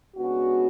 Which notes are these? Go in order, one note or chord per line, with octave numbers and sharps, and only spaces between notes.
C#3 G#3 B3 D4 F#4